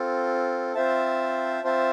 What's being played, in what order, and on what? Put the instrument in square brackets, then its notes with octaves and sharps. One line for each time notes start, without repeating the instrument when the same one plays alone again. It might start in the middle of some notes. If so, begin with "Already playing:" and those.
Already playing: [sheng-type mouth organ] C4 F4 A4
C4 F4 C5 E5 A5
C4 F4 C5 E5 A5